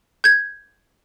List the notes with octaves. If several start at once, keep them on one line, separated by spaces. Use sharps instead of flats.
G6 G#6